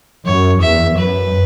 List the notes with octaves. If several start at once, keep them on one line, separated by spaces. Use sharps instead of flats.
F#2 C#5
E2 E5
F#2 B4